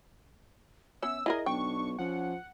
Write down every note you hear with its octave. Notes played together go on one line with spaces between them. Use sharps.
B3 C#4 E5 E6
E4 G#4 A#4 D5 D#5
B1 D4 G5 C#6
F3 C#4 F#5